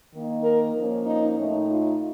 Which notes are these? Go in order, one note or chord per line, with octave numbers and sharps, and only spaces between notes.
D#3 A#3 D#4
A#4
F3 A#3 C#4
D#4
A2 A3 D#4
F4